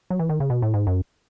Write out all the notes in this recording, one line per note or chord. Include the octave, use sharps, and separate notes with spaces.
F#3
E3
D#3
C#3
B2
A2
G#2
F#2